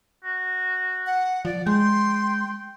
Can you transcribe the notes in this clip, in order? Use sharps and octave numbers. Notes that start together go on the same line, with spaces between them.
F#4
F#5
F3 D5
G#3 G5 C6